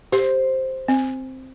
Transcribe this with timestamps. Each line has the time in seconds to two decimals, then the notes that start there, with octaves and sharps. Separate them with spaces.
0.12 G4 C5
0.88 C4